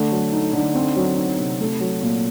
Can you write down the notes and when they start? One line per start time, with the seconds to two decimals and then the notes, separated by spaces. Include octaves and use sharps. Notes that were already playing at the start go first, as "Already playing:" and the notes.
Already playing: D3 A3
0.11 F#3
0.32 D#4
0.53 D3
0.74 C4
0.96 F#3
1.18 D#4
1.38 C3
1.60 A3
1.80 F#3
2.02 A#2